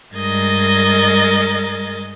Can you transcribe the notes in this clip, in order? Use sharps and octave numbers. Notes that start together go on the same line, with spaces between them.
G2 G#3 A#4 D#5 G#6 A6